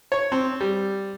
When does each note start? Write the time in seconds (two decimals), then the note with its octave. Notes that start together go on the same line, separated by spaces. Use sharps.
0.12 C#5
0.32 C4
0.61 G3